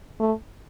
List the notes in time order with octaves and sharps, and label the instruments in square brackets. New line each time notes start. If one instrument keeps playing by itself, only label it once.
[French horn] A3